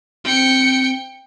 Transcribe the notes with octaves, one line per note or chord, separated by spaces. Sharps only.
C4 G5 C#7